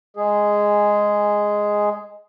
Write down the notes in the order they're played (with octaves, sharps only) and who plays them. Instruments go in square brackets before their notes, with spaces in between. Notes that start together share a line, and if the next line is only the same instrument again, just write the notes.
[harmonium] G#3 G#4